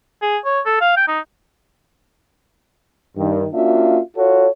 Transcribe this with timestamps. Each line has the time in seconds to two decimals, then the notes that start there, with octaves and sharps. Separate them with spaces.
0.22 G#4
0.45 C#5
0.66 A4
0.81 F5
0.97 G5
1.08 D#4
3.17 G2 D#3
3.53 A#3 C#4 D4 F4 F#4 E5
4.17 F4 F#4 A4 C#5